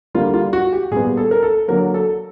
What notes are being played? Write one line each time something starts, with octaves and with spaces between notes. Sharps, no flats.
D3 G3 A#3 F4
F4
F#4
G4
A#2 G3 B3 G#4
A4
A#4
A4
D3 F#3 A#3 A#4
A4